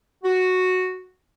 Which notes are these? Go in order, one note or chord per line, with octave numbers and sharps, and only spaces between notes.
F#4